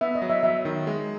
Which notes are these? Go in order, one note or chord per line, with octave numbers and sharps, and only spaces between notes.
B3 E5
D#5
F#3
E5
F#3 E5
D#3
G#3